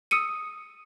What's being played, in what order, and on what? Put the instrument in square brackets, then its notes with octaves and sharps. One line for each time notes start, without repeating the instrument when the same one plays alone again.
[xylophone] D#6 E6 C#7 D#7